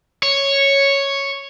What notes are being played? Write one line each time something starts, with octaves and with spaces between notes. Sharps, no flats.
C#5